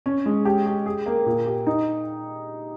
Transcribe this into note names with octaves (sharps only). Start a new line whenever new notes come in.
C#4
G#3
G4
G4
G#4
A#3
A#2
G4
D#4